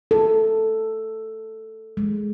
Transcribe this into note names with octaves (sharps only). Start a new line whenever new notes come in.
A4
G#3